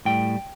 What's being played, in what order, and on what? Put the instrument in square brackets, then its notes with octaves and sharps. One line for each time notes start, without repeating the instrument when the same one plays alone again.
[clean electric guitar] A2 G3 G5